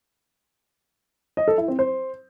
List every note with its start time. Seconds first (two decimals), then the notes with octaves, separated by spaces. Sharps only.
1.37 D#5
1.48 A4
1.58 E4
1.68 C4
1.79 C5